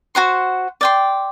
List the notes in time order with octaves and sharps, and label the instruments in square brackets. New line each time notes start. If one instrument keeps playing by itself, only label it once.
[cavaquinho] F#4 C5 F#5 C6
D5 G5 C6